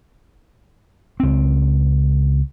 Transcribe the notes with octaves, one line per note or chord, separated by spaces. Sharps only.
C#2 C4